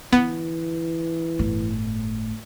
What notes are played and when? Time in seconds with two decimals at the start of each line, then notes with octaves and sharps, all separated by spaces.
0.13 D3 E3 B3
1.39 G1 A2